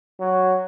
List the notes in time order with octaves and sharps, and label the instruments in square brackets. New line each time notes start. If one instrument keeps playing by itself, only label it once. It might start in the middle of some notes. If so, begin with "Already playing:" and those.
[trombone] F#3